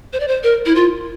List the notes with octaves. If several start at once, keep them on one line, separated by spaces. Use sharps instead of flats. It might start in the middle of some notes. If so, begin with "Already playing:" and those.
C5
D5
C5
A#4
E4
F4